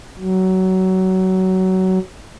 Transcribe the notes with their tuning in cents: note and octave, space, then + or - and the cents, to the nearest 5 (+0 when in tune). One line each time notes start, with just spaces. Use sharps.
F#3 +20